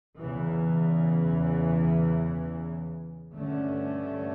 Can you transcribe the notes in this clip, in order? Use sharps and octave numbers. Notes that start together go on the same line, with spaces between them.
E2 C#3 E3
G2 D3 A3 C#4